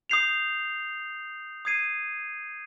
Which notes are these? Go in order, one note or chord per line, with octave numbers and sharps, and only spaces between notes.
D#6 G6 C7 F7
D#6 G#6 C7 D#7